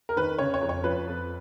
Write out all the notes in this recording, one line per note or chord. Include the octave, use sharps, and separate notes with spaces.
A#4
D#3 B4
C#3 C#5
C#5
F2
C#5
F3 B4
F2